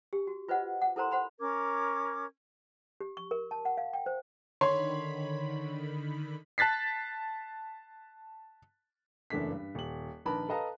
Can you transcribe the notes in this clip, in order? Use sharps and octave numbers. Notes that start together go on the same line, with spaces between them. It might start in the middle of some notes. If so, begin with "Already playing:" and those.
G4
F#4
F4 B4 C5 D#5 F#5
F#5
E4 A4 A#4 C5 A#5 C6
C5 F#5 B5 C6
C#4 A#4 D6 G#6
G4
C#6
A#4
A5
F#5
F5
G5
C5
D3 D#3 C#5 B5 C6
A5 F#6 A6 B6 C7
F#1 E2 A3 D4 B6
G2
D#1 F#7
A#1 D#3 A#4 B4 A5 B5
A4 B4 D#5 F5 A5 A#5